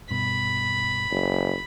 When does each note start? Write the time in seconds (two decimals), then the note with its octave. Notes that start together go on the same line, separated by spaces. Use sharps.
0.10 G2 B2 B5
1.11 F#1